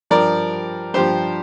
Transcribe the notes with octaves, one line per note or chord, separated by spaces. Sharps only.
G2 F3 A#4 D5
G2 F3 G4 C5